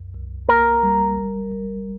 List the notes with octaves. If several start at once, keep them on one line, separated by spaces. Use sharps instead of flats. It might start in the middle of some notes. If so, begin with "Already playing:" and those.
Already playing: C2 F#2
C2
A#3 A#4
G3
G1
G1